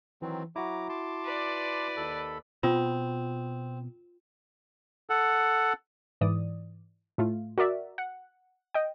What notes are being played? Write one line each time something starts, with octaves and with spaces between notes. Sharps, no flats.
D#3 E3 F#3 C4
F#3 E4 F#4 A#5 D6
A5 C6 D6
B4 D5
D#2 A4 B5
B2 B3 C4 F4
A4 F#5
G#2 E3 D5 D#6
A2 A3 F4
F#4 A#4 D5 E5
F#5
D#5 G5